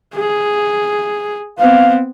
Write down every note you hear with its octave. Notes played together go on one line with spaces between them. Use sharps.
G#4
B3 C4 F5